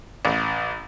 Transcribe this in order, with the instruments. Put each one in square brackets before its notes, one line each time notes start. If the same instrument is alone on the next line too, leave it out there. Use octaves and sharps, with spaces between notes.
[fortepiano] A1